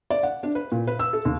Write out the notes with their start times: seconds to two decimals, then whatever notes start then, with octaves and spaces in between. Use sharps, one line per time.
0.10 D5
0.23 F#5
0.43 D4
0.55 B4
0.72 A#2
0.87 B4
0.99 E6
1.13 A4
1.25 D#2